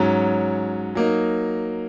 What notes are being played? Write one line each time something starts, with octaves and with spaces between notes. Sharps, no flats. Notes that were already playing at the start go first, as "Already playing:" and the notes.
Already playing: G#2 F#3 C#4
F#3 A#3 D#4